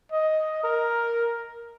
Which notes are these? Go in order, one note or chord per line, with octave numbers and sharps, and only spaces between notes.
D#5
A#4